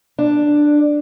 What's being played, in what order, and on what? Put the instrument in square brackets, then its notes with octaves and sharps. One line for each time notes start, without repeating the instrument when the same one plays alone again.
[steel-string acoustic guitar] D4